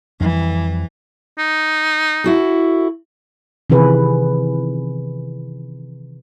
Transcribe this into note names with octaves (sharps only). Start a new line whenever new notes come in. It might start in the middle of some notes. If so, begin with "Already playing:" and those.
F2 E3 G3
D#4
E4 F#4 A4
C3 D#3 E3 G#4 B4